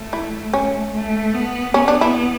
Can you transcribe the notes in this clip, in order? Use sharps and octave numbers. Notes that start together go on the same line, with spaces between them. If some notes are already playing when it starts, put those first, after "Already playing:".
Already playing: A3
E4
C#4
A3
B3
B3 C#4
D4
E4